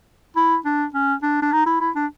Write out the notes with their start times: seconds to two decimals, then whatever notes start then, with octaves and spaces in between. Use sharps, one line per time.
0.36 E4
0.65 D4
0.94 C#4
1.23 D4
1.42 D4
1.52 D#4
1.66 E4
1.80 E4
1.96 D4